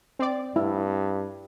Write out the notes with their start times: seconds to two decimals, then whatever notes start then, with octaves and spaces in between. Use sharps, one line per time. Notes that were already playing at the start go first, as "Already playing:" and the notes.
0.19 C4 D5
0.56 G2 E4